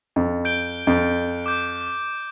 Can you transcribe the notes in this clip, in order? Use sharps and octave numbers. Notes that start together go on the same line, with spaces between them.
F2
G6 D7 G7
F2
D6 G6